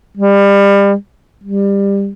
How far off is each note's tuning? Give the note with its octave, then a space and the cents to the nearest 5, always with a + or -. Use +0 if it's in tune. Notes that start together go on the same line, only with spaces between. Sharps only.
G3 +30
G3 +20